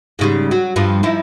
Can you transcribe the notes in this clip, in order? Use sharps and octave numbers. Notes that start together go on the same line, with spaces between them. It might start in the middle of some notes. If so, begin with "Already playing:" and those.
G#2 C#3 G3
F#3
G2 F3
F3 D#4 E4